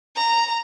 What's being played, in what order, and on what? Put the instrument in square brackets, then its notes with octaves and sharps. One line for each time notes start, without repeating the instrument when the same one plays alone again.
[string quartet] A#5